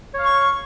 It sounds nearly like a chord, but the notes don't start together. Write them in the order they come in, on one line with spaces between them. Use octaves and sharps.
C#5 F5 C#6